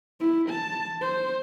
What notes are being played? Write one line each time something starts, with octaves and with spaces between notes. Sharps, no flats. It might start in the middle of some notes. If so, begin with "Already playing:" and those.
E4
A5
C5